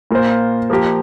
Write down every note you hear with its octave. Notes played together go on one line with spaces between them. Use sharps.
A#2 A#3 F4 C5
F3 A#3 G4 A#4